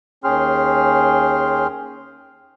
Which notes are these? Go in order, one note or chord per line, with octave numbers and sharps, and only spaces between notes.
D#2 C#4 G#4 G5 C6 F6